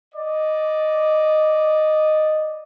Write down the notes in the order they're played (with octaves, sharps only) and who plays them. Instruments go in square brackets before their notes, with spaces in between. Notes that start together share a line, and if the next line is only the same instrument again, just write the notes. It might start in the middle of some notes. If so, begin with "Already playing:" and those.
[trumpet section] D5 D#5